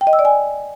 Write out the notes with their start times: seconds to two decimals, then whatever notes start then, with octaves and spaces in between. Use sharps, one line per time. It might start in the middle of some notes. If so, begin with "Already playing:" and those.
0.01 G5
0.07 D#5
0.13 E6
0.19 D5
0.25 G#5